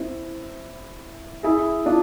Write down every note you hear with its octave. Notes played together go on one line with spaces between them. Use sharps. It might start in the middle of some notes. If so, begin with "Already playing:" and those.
Already playing: C4 E4
E4 G#4
D4 F4